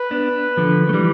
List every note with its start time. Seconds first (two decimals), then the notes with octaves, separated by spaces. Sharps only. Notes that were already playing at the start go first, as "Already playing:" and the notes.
Already playing: B4
0.11 B3 D4
0.57 D3 F3
0.89 A3
0.94 E3 G3